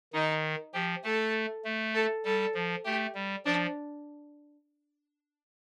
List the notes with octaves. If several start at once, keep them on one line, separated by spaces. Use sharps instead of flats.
D#3 D#4
F3 G4
A3 A4
A3
A4
G3 A4
F3
A3 G4
G3
F3 D4